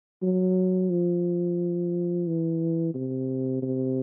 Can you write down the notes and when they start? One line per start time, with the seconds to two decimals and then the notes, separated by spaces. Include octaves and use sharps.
0.23 F#3
0.91 F3
2.27 E3
2.94 C3
3.63 C3